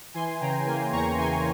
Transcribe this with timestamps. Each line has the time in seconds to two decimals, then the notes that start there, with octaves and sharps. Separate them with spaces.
0.14 E3 G#5 C6
0.40 C#3 G5 A#5
0.66 A#3 G#5 C6
0.92 E2 A#5 C#6
1.18 E3 G#5 C6